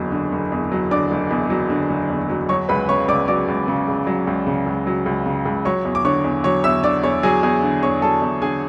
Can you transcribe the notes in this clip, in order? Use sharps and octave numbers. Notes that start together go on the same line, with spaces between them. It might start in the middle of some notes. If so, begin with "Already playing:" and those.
Already playing: F#1 E2 D3 F#3
D3
F#1
E2
F#3
D3 D5 D6
F#1
E2
F#3
D3
F#1
E2
F#3
F#3 C#5 C#6
C#2 B4 B5
C#3 C#5 C#6
C#2 D5 D6
F#3 D5 D6
C#2
C#3
C#2
F#3
C#2
C#3
C#2
F#3
C#2
C#3
C#2
F#3 C#5 C#6
E2
D6
D3 C#5 C#6
E2
F#3 C#5 C#6
E2 E5 E6
D3 D5 D6
E2 C#5 C#6
F#3 G#4 G#5
E2 G#4 G#5
D3
E2 C#5 C#6
F#3 A4 A5
E2
D3 G#4 G#5